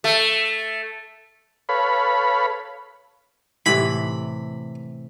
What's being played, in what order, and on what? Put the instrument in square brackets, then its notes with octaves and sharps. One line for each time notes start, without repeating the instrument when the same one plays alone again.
[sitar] A3
[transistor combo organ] A4 B4 C#5 F5 B5
[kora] A2 C3 E3 [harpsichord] B5